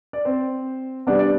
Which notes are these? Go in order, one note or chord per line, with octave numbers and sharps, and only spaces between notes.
D5
C4 C5
C3 G3 B3 D4 D5
D5